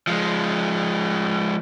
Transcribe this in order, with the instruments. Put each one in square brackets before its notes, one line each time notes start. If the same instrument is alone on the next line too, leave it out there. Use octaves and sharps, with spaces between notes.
[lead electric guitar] F3 G#3